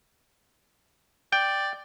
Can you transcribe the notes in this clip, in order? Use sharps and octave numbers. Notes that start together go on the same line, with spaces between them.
D5 G5